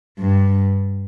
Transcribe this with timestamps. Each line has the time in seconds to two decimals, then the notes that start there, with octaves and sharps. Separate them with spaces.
0.19 G2